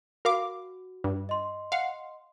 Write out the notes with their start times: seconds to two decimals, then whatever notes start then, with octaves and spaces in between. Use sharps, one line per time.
0.25 F#4 A#4 F5 D6
1.04 G2
1.29 D#5 C6
1.72 F5 F#5